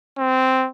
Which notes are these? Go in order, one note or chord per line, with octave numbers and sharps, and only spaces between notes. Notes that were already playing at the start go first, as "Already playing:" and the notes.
C4